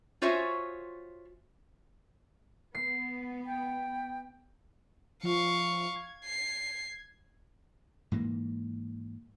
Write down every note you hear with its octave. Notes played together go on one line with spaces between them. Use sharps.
F4 F#4 C5 C#5 E5 G#5
B3 C7
G5
F3 F5 C#6
G#6
C7
G#2 E3 A#3